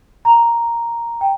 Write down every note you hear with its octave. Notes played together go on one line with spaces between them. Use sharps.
A#5
G5